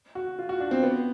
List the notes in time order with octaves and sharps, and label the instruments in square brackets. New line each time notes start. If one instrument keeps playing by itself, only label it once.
[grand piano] F#4
F4
F#4
D4
C4
B3